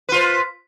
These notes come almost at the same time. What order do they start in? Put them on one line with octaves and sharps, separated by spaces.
B4 F4 C5